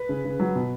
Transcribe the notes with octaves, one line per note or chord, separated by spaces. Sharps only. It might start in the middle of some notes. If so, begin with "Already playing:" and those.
Already playing: B4
C#3
C#3
F#3
B2